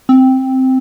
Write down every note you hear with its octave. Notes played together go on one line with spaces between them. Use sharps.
C4